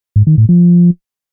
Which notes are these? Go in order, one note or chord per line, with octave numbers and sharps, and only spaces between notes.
G#2
D#3
A2
F3